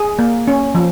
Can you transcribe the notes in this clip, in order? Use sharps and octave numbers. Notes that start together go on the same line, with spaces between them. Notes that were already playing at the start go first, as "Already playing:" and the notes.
Already playing: G#4
A#3
C#4
F3